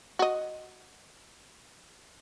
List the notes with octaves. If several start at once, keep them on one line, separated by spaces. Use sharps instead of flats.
F#4 D#5